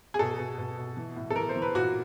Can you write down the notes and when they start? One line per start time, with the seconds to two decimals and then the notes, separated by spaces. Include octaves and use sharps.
0.14 G#4
0.19 B2 A4
0.39 B2
0.58 B2
0.78 B2
0.97 E3
1.16 A2
1.30 A4
1.36 E3 A#4
1.49 C5
1.56 E3
1.62 B4
1.75 A#2 F#4